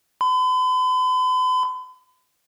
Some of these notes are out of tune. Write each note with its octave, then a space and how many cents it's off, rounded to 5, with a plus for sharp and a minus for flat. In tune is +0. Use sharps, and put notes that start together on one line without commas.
B5 +45